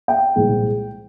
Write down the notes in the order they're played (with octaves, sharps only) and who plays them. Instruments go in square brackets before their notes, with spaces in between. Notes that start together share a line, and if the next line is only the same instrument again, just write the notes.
[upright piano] G5
C2 A#2 F3 G#3